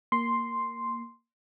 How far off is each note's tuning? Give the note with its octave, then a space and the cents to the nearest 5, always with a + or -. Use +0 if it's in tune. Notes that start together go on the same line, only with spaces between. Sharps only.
A#3 +0 C6 +0